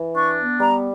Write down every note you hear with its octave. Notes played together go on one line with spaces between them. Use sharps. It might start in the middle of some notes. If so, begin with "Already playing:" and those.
Already playing: E3
D4 C#6
B3
G3 A#5